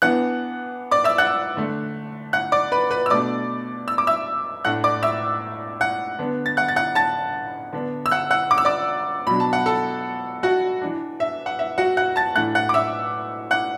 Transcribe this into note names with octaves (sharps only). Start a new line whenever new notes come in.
E3 B3 D4 F#5 F#6
D5 D6
E5 E6
F#5 F#6
D3 A3 D4
F#5 F#6
D5 D6
B4 B5
B4 B5
E6
B2 A3 D4 D5 D6
E6
D6
E5 E6
A2 A3 D4 F#5 F#6
D5 D6
E5 E6
F#5 F#6
D3 B3 D4
A6
F#5 F#6
A6
F#5 F#6
A5 A6
D3 B3 D4
E6
F#5 F#6
F#5 F#6
D6
E6
D5 D6
B2 F#3 D4 B5
A5
F#5
A4 A5
F#4 F#5
E3 D4
E5
F#5
E5
F#4 F#5
F#5 F#6
A5 A6
A2 E3 A3 D4 F#5 F#6
F#5 F#6
D6
E5 E6
F#5 F#6